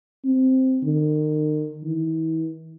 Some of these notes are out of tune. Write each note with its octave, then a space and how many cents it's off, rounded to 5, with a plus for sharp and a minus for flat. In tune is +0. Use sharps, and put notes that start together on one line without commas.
C4 -5
D#3 -35
E3 -40